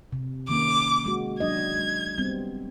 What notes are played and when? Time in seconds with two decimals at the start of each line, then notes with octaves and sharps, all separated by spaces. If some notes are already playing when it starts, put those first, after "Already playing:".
0.12 C3
0.49 D#3 A#3 C#4 D6
1.06 G#3 F#4
1.40 F#3 D4 D#5 G#6
1.77 G#3
2.18 G3 B3 C4